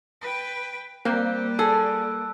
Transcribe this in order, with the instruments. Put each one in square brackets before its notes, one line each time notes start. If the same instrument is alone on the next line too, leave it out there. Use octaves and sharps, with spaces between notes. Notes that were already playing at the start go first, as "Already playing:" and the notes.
[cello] B4 G5
[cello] G3 [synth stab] A#3 [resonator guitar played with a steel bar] C4 [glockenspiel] F#6
[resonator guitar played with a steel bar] G#4 A4 [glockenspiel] A5 E6